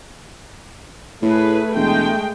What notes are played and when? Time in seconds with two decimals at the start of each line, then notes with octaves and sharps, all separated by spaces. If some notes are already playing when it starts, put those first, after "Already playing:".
1.22 A2 A3 G#4 B4
1.75 E1 G#3 G5